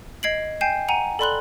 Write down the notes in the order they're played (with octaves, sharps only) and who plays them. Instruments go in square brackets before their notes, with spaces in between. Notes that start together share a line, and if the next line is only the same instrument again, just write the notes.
[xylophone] D#5 G#6 C7 D7 F#7
G5 G#5 G6 C7 E7
F#5 G#5 A#5 D#7
A4 D5 B5 C6 F#6 F#7